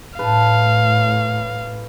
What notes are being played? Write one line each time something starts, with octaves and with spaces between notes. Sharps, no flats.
A2 B4 F5 A5